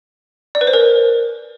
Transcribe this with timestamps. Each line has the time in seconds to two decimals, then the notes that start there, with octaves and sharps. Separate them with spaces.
0.55 D5
0.61 B4
0.67 C5
0.73 A#4